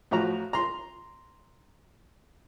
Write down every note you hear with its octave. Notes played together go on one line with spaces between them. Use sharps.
A2 F3 F#4 A#5
A#5 C6